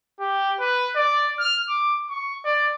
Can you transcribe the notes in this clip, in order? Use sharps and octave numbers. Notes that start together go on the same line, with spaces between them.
G4
B4
D5
F6
D6
C#6
D5